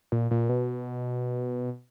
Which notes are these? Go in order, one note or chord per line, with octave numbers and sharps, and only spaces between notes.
A#2
A#2
B2